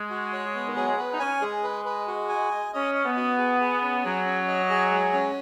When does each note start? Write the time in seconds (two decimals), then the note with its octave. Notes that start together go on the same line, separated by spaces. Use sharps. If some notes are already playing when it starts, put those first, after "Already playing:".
Already playing: G#3
0.10 F#4
0.33 C#5
0.55 B3
0.66 D#3
0.76 F#3 G#4
0.87 G#3
0.98 B3 B4
1.13 D#4
1.19 C#4 G#5
1.41 G#3 G#4
1.63 B4
1.85 B4
2.07 F#4
2.29 G#5
2.51 D#5
2.73 C#4 D#5
2.95 D#5
3.05 B3
3.17 F#4
3.38 G#4
3.60 G#4
3.82 C#4
4.04 F#3 G#4
4.26 C#4
4.48 D#5
4.70 G#4
4.91 G#3
5.13 C#4